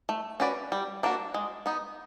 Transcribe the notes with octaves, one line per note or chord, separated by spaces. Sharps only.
A3
C#4 F#4 B4 D5
G3
A#3 D4 F#4
G#3
B3 D#4